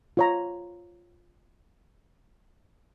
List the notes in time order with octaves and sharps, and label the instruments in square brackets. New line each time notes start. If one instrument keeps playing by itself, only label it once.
[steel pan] F4 C#5 A#5